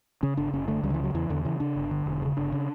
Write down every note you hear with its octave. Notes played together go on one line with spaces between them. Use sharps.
C#3 C#4
G1 D4
F#1 C#4
D3 A3
C#2 G3
D3
E3
C#3 F#3
E2 E3
E2 D3
C#3 E3
C#3 D4
G1
D3
E1
C#3
G1 D4
C#3